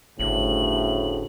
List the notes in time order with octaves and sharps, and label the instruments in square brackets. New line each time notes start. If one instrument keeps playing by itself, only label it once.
[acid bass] G1 [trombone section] D2 A2 C#3 [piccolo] F#7